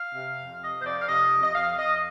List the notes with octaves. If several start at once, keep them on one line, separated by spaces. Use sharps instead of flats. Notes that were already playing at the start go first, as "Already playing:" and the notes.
Already playing: F5
C3
F2
C3 D#5
C5
F2 D5
F5
C3 D#5
F2
D#5
F2 F5
F2 D#5